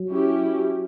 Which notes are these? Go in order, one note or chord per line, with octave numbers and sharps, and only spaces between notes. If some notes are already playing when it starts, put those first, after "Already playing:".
Already playing: F#3
C#4 E4 G4